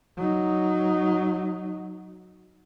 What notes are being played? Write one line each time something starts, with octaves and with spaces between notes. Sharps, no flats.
F#3 D#4